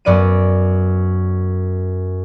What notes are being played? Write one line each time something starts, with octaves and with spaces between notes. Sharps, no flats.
F#2 B3 D5 D7 D#7